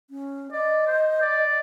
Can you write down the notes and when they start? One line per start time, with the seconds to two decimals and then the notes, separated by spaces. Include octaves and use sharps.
0.10 C#4
0.52 D5 D#5
0.87 C5
1.22 D5